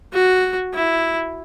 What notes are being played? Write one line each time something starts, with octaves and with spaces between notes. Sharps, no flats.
F#4
E4